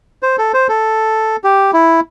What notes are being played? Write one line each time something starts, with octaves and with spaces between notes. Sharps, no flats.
C5
A4
C5
A4
G4
E4